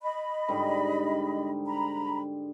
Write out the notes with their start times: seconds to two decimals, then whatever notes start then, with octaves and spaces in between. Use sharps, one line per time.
0.02 D#5 B5
0.49 G#2 D3 G3
1.67 A#5 B5